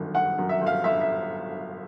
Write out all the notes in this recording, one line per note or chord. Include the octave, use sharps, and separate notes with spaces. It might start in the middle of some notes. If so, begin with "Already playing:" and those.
Already playing: G1 F#2 D#3
G1 F#5
F#2
E5
G1
F5
G1 E5
E5